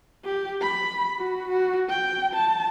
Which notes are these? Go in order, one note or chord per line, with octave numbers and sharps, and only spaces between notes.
G4
B5
F#4
F#4
G5
A5